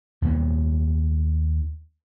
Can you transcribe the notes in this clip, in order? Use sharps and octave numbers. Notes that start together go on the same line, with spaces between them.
D#2 G3 A#3 B3